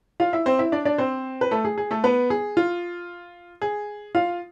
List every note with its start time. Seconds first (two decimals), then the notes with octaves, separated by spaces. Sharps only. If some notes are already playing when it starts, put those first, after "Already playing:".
0.20 F4 F5
0.33 E4 E5
0.46 C4 C5
0.59 E4 E5
0.72 D4 D5
0.85 D4 D5
0.98 C4 C5
1.41 B4
1.51 A3 A4
1.65 G#4
1.78 G#4
1.91 A3 A4
2.04 B3 B4
2.30 G#4
2.57 F4
3.62 G#4
4.15 F4 F5